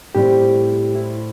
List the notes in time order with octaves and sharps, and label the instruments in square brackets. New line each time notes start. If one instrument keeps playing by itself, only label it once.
[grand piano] A2 G3 C4 [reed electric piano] G4
[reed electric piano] E4